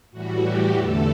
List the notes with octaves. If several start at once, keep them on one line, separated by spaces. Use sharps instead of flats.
A2 E3 G3 F#4
G4
E2 D3 A3 A4